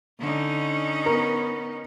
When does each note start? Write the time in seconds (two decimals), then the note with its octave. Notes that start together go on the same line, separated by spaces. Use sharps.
0.20 D3 C#4 D#4
1.06 B3 A#4